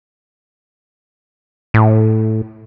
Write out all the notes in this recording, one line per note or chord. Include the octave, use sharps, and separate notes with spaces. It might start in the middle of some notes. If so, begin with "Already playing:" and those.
A2